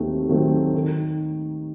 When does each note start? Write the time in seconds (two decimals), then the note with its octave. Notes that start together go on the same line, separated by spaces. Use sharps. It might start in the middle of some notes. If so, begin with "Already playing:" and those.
Already playing: D#2 D#3 F#3 A3 C4
0.28 D#3 F#3 A3 C4
0.74 D#3